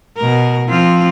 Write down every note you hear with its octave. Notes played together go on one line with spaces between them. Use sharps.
B2 A#4
F3 C4 F4